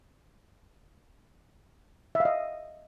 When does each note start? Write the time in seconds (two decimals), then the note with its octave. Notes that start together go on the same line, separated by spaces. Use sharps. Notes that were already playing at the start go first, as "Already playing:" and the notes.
2.15 E5
2.20 F5
2.25 D#5